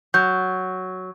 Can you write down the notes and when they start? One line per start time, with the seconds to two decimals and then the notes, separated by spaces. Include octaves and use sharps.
0.14 F#3 G6